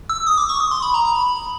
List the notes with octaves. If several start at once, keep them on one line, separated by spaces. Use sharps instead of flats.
E6
D#6
D6
C#6
D#6
C6
B5
A#5
A#5
B5